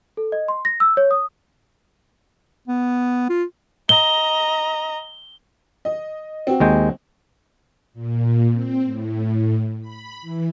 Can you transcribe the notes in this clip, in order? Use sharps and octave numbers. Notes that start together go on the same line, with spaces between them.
A4
D#5
C6
A#6
E6
C#5
D#6
B3
F4
D#5 A#5 G7
D#5
C4 F#4
D#2 G#3 G5
A#2
C4
A2
B5
E3